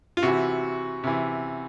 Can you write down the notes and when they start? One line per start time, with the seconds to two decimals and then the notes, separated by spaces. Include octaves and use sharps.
0.17 F4
0.23 C3 E3 F#4
1.04 C3 E3